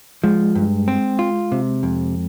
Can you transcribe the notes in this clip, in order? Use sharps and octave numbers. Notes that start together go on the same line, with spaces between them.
F3 G#3
G2
C4
F4
C3
F2